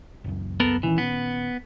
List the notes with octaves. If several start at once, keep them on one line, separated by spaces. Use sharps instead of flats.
F#1 C#2 F#2
B3 A4 A#4
A#2 D#3 E3 C#4
B3